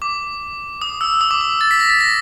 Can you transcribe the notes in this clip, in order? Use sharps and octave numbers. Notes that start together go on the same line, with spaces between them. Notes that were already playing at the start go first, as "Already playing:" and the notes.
D6
D#6
E6
D#6
D6
D6
A6
B6
A#6
A6
A#6